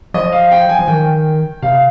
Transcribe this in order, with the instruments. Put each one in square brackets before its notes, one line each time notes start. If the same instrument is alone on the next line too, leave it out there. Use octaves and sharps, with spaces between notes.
[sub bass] F3 [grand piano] D#5
[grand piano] F5
G5
G#5
[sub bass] F3
[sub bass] D#3 [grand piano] G5
[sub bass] C3 [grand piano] F5